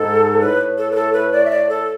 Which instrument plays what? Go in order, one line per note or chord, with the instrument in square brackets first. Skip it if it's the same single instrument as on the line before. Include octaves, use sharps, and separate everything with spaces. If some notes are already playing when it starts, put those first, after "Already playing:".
Already playing: [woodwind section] G#2 [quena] A4
[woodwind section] A2 [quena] B4
[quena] A4
B4
A4
B4
D5
E5
D5
A4